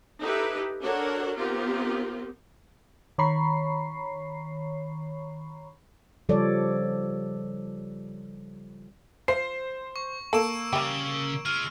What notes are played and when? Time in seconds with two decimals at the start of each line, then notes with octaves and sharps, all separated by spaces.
0.21 D#4 E4 G4 A4 B4
0.82 D4 F#4 A4 A#4 C#5 F#5
1.36 B3 C4 D#4 F4 G4 A#4
3.18 D#3 C#5 A#5 B5 C#6 C7
6.29 C#3 F3 G3 A4 C#5 D5
9.28 F3 C5 C7
9.96 C#6
10.33 A#3 A4 E6 D7 E7
10.73 C#3 G3 G4
11.46 G#3 F4 F6